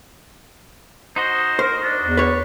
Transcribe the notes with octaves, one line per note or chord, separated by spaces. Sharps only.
D#4 F#4 C5 D#5
A#4 C5
D4
E2
B4 C#5